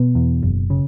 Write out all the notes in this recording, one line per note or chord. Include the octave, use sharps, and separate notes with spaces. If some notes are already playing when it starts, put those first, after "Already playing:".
Already playing: B2 B3
E2
F#1
C#3